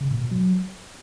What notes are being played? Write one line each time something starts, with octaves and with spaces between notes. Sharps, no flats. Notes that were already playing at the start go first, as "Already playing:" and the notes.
C#3
A#2
B2
F#3